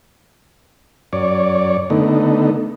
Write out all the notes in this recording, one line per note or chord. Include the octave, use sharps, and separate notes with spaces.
F#2 C#5 D5
D3 A3 B3 D#4